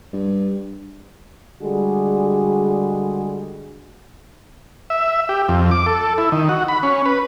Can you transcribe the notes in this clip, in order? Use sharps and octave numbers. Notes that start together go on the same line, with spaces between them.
G2
D3 G3 G#3 F#4 G#4
E5
G4
F2
D6
A4
E4
D#3
F#4
B5
C#4
B4